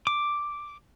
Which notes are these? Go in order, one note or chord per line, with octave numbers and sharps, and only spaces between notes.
D6